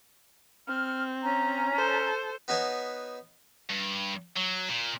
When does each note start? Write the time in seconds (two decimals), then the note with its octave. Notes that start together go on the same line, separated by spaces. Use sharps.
0.68 C4 F6
1.23 C#4 A#5
1.75 A4 C5
2.48 B3 D#4 F#4 B4 C#5 A5
3.69 G2
4.36 F#3
4.69 A#2